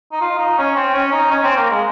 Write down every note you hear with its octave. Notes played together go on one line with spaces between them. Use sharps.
D#4
F4
D#4
C#4
C4
C#4
D#4
C#4
C4
A#3
G#3